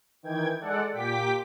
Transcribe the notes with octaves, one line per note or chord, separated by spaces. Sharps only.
D#3 E3 G5 G#6
G#3 A4 D5 F#5
A#2 G4 G5 D6 B6